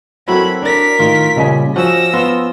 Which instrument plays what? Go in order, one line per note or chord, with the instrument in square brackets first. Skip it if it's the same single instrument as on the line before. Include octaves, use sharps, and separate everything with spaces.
[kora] F#3 E4 F#4 [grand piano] C4 A4 A#4 [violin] B5
[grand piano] D4 [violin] A#4 B6
[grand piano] A2 [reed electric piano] D#3 [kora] F4
[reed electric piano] A#2 C#3 G3 [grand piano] D5 D#5 G#5
[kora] F3 C#4 [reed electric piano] F#4 [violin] E6 A#6
[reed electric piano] B3 [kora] F4